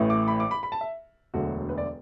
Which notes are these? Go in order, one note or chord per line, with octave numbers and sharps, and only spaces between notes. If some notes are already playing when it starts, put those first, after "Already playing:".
Already playing: A1 A2 E3
D6
B5
D6
B5
B5
A5
E5
E1 D2 D3 F#3 F#4
B4
D5